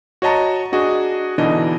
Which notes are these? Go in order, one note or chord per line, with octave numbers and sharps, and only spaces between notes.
F#4 C#5 D#5 A5 A#5
D4 F#4 G#4 D#5
B2 D3 E3 D4 D#4 D#5